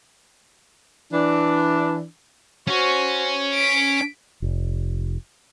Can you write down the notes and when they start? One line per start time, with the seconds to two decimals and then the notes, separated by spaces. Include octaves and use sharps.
1.13 E3 D4
2.67 C#4 F#4 C5
3.54 B6 D7
4.42 F1